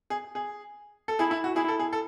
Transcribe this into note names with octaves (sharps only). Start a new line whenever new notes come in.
G#4
G#4
A4
E4 G#4
E4
F#4
E4 G#4
A4
G#4
A4